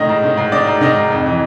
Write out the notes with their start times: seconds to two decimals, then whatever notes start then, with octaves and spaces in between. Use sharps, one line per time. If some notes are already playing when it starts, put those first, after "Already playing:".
Already playing: A2 D#3 D#5
0.09 G#2
0.24 D#3
0.37 G#2
0.52 D#3 D5
0.67 G#2
0.81 D#3 D#5
0.96 G#2
1.10 F2
1.26 E3